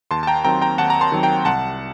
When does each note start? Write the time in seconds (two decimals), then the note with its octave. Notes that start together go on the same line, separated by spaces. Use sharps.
0.11 D#2 A5 C6
0.23 A5
0.27 G5 A#5
0.44 D#3 F#3 C4 G5 A#5
0.61 G5 A#5
0.78 D#2 F#5 A5
0.90 A#5
1.01 A5 C6
1.12 D#3 F#3 C4
1.23 G5 A#5
1.45 C2 F#5 A5